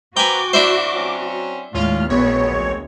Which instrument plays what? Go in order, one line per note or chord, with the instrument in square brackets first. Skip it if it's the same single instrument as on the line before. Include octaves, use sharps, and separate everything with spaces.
[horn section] C4 B4 A#5 [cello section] F#4 [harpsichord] G5 G#5 [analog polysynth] D6
[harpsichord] D4 E4 C5 [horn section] E5
[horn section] F#3 C4 C#4
[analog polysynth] D#2 F6 [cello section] A2 G#3 [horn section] C#4 F4
[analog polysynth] A#1 C#5 [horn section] F#2 G#3 C4 [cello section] B3
[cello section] D2